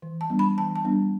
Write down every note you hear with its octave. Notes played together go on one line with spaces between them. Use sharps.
E3
A5
G3 B3 D4
B5
E3 A5
A5
G3 B3 D4